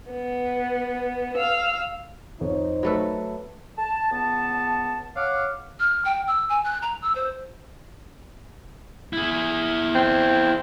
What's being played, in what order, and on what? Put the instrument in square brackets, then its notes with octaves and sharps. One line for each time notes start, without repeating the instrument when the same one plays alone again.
[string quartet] B3
F5 E6
[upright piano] F2 C#5 [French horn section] D#4 C5
[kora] F#3 A3 B4 [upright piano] B5 E6
[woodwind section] A5
C#2 B3 A5
C#5 F5 F#5 D6 F6
[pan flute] F6
G5
E6
G#5
F#6
A#5
E6
C5
[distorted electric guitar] E4 G#4
[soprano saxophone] C4